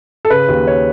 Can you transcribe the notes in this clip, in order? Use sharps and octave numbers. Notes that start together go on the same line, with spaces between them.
A4
C#3 B4
D#2
C#5